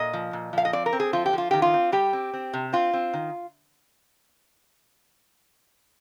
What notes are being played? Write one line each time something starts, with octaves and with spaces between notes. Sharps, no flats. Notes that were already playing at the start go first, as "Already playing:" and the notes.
Already playing: A#2 D#5
F3
A#2
F3 F5
D#5
C4 D5
A#4
C4
G#4
F3 F4
G4
F3 F4
D#3 G4
F4
C4
G3 G4
C4
C4
C3
C4 F4
C4
D#3